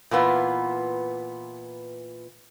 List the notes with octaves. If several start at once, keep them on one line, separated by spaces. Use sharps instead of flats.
A#2 E3 B3 F4